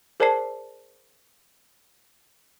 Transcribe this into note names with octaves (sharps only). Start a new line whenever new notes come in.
G#4 A#4 C5 D5 A5 C7